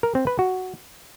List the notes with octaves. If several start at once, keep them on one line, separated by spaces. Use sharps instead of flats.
A#4
C4
B4
F#4